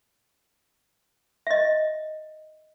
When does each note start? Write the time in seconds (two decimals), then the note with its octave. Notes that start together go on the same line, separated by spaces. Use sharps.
1.47 D#5 E5